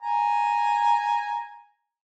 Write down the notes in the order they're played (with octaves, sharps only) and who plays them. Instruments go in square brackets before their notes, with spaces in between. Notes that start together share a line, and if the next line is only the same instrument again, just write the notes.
[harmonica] G#5 A#5